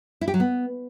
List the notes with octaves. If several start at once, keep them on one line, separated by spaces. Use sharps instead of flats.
E4
G4
F#3
B3